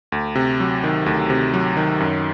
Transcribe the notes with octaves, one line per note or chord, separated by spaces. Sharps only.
D2
C3
F#3
D#3
D2
C3
F#3
D#3
F#2